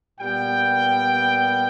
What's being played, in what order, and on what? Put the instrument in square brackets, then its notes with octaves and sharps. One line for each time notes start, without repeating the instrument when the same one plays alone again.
[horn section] A#2 G3 B3 G5